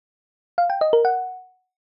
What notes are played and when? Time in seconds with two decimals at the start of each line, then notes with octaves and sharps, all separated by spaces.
0.58 F5
0.70 G5
0.81 D#5
0.93 A#4
1.05 F#5